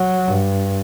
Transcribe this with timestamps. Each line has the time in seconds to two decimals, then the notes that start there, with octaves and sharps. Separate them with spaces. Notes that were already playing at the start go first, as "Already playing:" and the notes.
Already playing: F#3
0.28 G2